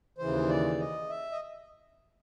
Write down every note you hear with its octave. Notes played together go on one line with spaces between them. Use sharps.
D#2 C#3 E3 C5
D5
D#5
E5
D#5